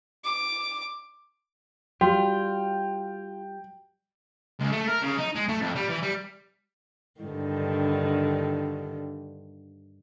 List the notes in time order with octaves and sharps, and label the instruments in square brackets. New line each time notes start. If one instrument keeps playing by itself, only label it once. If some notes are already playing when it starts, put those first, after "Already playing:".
[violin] D6
[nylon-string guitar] G3 [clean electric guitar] F4 [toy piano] F#4 [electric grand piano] G5
[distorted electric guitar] C#2
A3
A#4
C#3
D#4
G#3
A3
F2
G3
E3
G3
[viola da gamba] G2 D3 D#3